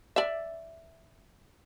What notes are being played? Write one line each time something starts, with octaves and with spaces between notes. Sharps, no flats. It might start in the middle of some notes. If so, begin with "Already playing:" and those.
D5 E5